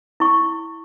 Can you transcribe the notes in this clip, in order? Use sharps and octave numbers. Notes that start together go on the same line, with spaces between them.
E4 C#6